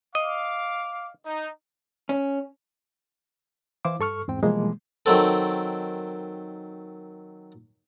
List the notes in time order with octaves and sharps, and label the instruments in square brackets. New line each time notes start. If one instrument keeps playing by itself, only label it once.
[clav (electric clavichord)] D#5 [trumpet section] F5 D6
[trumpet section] D#4
[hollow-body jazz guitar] C#4
[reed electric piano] E3 E4 C5 F5 D6
G2 A4 C#6 F6
E2 G#2 C4 G5
B2 E3 F3 G3 G#3 A#3
[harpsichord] D#3 F#3 C4 A4